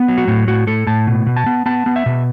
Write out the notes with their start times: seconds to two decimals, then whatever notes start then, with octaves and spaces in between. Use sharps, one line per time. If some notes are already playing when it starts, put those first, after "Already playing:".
Already playing: B3
0.08 F#3
0.18 F#4
0.28 A2
0.48 A2 F#4
0.67 A2 A4
0.87 A2 A5
1.07 B2
1.27 B2
1.36 A5
1.46 B3
1.66 B3 A5
1.86 B3
1.96 E5
2.06 B2